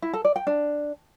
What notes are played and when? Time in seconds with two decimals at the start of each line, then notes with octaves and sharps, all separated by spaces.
0.02 E4
0.13 A4
0.25 D5
0.36 G5
0.47 D4